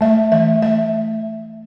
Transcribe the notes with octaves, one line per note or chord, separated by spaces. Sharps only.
A3 E5
E3 E5
A3 E5